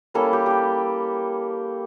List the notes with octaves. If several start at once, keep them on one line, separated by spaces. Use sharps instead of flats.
G3 A#3 C#4 E4 A4
G4
G4 A4